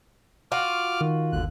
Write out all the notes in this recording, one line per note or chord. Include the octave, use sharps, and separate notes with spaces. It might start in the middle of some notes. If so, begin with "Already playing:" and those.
F4 F#4 D6 F6
D#3
G1 D#2 D3 F#6